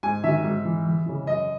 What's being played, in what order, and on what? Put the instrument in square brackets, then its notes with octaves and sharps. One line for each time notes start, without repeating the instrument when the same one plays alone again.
[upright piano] G#2 G#5
D#3 F#3 E5
G#2
E3
E2
C#3 E3
F#2 D#5